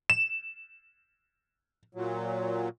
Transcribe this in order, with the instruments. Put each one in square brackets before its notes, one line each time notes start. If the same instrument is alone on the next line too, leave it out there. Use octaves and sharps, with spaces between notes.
[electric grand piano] E7
[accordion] A#2 F#3